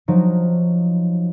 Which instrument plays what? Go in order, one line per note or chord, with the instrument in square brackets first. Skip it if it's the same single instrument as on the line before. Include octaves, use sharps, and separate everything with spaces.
[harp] F3 F#3 D#4